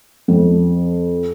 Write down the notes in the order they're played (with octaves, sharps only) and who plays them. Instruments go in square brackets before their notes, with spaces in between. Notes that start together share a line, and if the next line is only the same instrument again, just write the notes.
[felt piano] F2